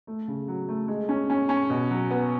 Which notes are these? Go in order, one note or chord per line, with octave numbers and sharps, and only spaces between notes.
A3
C#3
F#3
A3
G#3
C#4
C#4
C#4
B2
F#3
B3